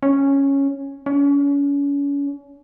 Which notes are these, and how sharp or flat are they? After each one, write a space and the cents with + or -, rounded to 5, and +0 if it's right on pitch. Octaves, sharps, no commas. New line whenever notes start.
C#4 -5
C#4 +35